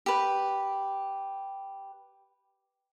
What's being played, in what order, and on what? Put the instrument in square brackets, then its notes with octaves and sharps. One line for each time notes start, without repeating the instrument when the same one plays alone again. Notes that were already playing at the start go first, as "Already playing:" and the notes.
[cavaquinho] G4 B4